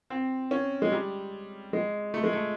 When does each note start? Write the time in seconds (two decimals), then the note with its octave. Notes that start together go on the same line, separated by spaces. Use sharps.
0.10 C4
0.51 C#4
0.82 G#3
0.92 G3
1.73 G#3
2.14 A3
2.24 G#3
2.33 A3